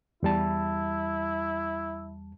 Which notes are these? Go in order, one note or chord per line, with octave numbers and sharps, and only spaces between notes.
E2 G3 E4 A5